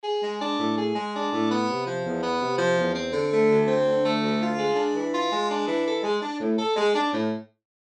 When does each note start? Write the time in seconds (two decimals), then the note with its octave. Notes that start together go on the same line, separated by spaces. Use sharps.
0.04 G#4
0.22 G#3
0.40 D4
0.58 A2
0.77 G#4
0.95 G#3
1.13 D4
1.31 A2
1.49 B3
1.68 C3
1.86 F3
2.04 E2
2.22 B3
2.40 C3
2.58 F3
2.77 E2
2.94 C4
3.13 D3
3.31 A3
3.49 D2
3.68 C4
3.86 D3
4.04 A3
4.22 D2
4.40 F4
4.58 G#3
4.76 D4
4.95 E3
5.13 F4
5.31 G#3
5.49 D4
5.67 E3
5.86 A4
6.03 G#3
6.22 D4
6.40 A2
6.59 A4
6.76 G#3
6.94 D4
7.13 A2